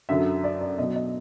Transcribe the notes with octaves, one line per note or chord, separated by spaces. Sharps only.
F#2 D3 F#3 E5
D5
D5
B2 F#3 D#5
D#5